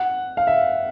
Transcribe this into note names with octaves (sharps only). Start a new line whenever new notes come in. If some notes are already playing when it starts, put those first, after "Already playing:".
Already playing: F#5
F5
E5